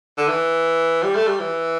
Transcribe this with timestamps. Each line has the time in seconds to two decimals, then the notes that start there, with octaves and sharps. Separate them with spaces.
0.18 D3
0.28 E3
1.03 G3
1.15 A3
1.27 G3
1.40 E3